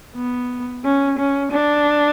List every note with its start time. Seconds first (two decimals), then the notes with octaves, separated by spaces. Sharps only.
0.16 B3
0.84 C#4
1.18 C#4
1.52 D4